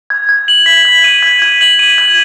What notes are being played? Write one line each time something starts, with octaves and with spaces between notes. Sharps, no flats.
G#6
G#6
F#7
B6
G#6
D#7
G#6
G#6
F#7
D#7
G#6